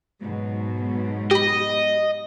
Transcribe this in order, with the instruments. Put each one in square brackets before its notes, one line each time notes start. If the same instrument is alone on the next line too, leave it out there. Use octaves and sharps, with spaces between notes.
[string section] G#2 B2 F#3
[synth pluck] G4 B5 [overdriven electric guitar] D#5